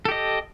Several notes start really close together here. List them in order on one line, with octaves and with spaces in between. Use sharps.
A4 G4 D#5